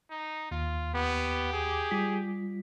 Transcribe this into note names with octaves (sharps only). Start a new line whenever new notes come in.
D#4
D#2 F4
B3 G4
G#4
G3 F4 B6